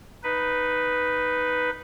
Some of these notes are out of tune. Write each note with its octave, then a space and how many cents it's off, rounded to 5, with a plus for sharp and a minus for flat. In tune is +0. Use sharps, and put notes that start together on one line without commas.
D#4 +0 B4 +0